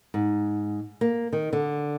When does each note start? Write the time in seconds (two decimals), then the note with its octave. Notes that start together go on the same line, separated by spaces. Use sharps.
0.14 G#2
1.01 A#3
1.33 D#3
1.53 D3